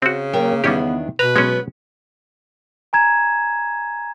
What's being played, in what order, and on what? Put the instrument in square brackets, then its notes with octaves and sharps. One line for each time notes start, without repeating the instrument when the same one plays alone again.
[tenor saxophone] C#3 [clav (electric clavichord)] C4 F#4
[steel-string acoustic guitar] F#3 A#4 G5 [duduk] A#3
[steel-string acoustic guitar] E2 D#3 D4 [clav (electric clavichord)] G3 C#4 G4 [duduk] B3
[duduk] B2 [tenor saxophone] B4 [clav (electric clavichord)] A#5
[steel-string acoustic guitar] F#3 B3 [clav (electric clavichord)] G#3 C#4
[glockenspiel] G#5 A#5 G#6 E7